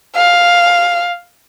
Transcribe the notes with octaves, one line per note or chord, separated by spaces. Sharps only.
F5